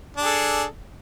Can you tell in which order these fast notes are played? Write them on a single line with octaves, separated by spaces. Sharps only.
D4 G#4 A4